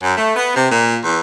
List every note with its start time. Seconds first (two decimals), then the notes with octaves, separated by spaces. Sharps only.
0.02 F#2
0.17 A3
0.36 B3
0.55 C3
0.71 A#2
1.03 E2